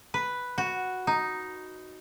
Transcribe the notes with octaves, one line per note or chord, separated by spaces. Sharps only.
B4
F#4
D#4